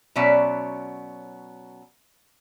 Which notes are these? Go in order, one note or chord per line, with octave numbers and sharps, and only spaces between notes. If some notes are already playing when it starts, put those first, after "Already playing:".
B2 F#3 C#4 D5 E5